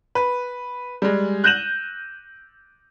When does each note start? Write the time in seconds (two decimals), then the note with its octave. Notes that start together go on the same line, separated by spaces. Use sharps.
0.15 B4
1.02 G3 G#3
1.44 F#6 G6 A#6 D#7 E7 F#7